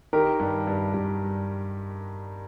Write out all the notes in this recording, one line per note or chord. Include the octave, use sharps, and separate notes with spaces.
D#3 G4 A#4
G2
G2
G2